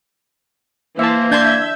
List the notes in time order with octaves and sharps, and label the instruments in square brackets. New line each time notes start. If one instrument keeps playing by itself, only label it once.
[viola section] E3 C5 [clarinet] A#3 [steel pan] E5 A5
[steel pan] D4 A5 C6 [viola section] E5 [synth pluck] G6 G#6